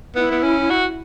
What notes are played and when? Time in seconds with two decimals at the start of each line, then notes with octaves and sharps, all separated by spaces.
0.16 B3 E4
0.31 B3
0.44 C#4
0.70 F#4